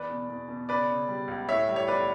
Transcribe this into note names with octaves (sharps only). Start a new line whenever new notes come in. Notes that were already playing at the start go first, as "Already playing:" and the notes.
Already playing: E2 B4 D5
B2
E2
B2
C#3 B4 D5
C#3
G3
C#2
A2 C#5 E5
G3
C#5
B1 B4 D5